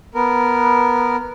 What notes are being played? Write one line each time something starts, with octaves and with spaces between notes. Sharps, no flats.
B3 A#4